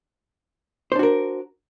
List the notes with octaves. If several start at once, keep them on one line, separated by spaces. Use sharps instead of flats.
D4 F#4 A#4 C5